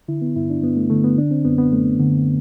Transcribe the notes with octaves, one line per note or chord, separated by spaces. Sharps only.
D3 E4
B3
G2 E4
D4
G2 B3
A3
D3 A3
B3
D3 D4
C4
F#2 B3
B3
F#2 A3
D3